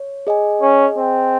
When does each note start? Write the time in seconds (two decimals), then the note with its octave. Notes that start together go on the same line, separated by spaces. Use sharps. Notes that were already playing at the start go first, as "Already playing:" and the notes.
Already playing: C#5
0.27 G#4 D#5 G#5
0.61 C#4
0.97 C4